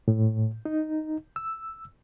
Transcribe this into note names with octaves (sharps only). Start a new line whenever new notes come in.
A2
D#4
E6